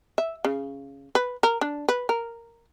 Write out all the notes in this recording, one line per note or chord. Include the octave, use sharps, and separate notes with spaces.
E5
C#3
B4
A#4
D4
B4
A#4